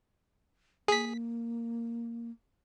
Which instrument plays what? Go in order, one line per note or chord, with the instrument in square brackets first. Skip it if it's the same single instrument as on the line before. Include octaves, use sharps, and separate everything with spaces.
[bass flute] A#3 [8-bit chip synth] G#4 B6